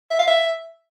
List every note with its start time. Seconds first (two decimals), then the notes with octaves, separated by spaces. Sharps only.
0.11 E5
0.19 F5
0.27 E5